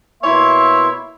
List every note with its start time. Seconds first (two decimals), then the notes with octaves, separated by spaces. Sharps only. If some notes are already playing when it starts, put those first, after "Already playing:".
0.23 B2 A#3 E4 C#5 E5 C6